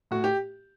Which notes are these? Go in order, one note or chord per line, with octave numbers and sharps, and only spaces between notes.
A2 F#4
G4